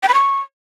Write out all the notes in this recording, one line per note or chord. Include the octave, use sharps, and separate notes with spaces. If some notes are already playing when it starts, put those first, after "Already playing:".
G5
B5
C#6